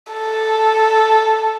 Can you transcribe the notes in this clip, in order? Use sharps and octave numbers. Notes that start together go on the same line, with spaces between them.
A4